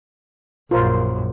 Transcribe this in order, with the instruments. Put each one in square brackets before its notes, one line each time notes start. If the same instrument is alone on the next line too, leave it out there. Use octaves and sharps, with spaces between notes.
[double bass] A#1 F#2 [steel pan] F4 A#4 C5